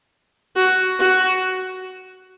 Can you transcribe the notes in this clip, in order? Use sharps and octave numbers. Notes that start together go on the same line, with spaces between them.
F#4
F#4